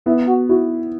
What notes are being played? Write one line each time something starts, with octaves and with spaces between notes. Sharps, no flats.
B3 E4
F#4
E4 F#4